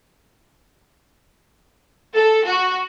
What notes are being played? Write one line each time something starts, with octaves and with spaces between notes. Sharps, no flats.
A4
F#4